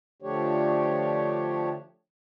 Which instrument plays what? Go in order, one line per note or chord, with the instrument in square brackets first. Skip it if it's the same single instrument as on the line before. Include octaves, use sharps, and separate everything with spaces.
[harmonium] D3 F3 A3 D4 G4 C#5